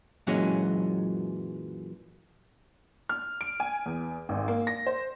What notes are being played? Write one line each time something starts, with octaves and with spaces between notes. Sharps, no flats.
F#2 A#2 E3 F#3 G#3 C#4
F6
D7
G#5
E2
G#1
A#3
A#6
C5